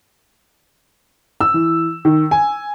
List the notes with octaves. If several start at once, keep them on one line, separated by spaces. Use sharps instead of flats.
E6
E3
D#3
G#5